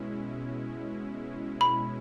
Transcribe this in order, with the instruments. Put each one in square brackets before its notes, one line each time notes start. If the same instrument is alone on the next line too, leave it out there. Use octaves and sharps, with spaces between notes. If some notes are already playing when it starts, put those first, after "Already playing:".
Already playing: [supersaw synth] B2 G#3 C#4 E4
[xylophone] B5